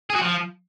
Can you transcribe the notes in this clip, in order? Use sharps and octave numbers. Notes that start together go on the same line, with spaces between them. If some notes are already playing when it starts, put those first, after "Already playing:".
G#4
F#4
F3